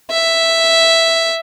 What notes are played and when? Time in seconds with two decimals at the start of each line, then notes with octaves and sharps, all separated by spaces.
0.10 E5